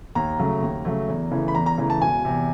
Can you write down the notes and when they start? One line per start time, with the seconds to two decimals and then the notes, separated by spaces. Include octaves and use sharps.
0.15 D#2 A#5
0.39 C#3 F#3 A3
0.62 D#2
0.85 C#3 F#3 A3
1.08 E2
1.31 C#3 E3 A3
1.48 B5
1.55 E2 A#5
1.66 A#5
1.78 C#3 E3 A3
1.90 A5
2.01 E1 G#5
2.25 E2 C3